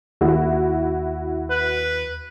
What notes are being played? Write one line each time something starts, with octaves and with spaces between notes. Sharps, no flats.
D#2 E4 F#4
B4